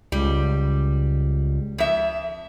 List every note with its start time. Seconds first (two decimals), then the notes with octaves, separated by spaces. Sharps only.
0.12 C#2 G3
1.78 F2 E5